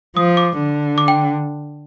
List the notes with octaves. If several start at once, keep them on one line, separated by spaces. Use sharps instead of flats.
F3 D#6
D6
D3
D6
G5